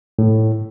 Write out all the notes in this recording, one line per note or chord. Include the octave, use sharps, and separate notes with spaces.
A2